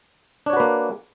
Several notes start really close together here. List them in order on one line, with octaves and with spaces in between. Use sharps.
D4 C#5 F#4 B4 A#3